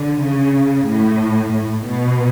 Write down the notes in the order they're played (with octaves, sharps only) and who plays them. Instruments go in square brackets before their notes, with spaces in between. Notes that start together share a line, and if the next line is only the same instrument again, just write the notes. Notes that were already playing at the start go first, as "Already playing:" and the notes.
Already playing: [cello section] D3
C#3
A2
A2
B2